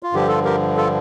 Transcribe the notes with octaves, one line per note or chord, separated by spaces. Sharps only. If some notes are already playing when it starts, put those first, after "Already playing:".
F4
G2 D3 F3 G4
F4 A4
G4 A#4
F4 A4